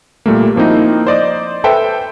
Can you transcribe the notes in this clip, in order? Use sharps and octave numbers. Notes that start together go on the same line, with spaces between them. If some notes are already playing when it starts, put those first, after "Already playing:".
A#2 G3 A3 A#3
F3 A#3 C4 D#4 E4
C5 D5 D#5 D6
A4 B4 C5 E5 G5